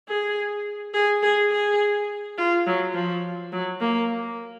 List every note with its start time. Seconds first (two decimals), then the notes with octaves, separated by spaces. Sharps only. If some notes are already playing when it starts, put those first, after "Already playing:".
0.08 G#4
0.94 G#4
1.23 G#4
1.52 G#4
2.38 F4
2.67 F#3
2.94 F3
3.52 F#3
3.81 A#3